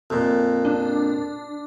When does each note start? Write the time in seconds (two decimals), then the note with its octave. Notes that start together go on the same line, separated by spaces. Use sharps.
0.10 F2 A#2
0.65 D4